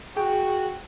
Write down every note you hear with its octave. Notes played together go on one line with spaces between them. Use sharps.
F#4 G#4 G5